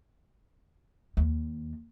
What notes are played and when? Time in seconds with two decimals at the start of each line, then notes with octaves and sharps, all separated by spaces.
1.17 D#2